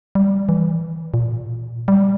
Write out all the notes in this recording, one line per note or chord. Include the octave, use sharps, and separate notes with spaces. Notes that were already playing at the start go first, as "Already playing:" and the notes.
G3
E3
A#2
G3